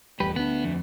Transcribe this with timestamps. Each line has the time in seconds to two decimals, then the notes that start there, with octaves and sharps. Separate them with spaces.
0.20 D1 E2 G3 G4 B4
0.36 D2 B3 D4
0.64 F2